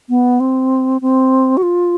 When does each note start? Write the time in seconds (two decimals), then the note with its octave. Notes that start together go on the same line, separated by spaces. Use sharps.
0.09 B3
0.40 C4
1.01 C4
1.57 F#4
1.63 F4